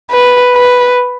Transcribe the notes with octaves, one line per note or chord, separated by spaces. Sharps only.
B4
B4